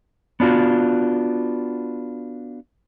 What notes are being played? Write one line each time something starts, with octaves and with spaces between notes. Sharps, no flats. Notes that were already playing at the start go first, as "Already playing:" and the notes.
B3 D4 F4 F#4